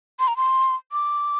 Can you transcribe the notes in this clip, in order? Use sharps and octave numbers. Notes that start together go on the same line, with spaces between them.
C6
A#5
C6
D6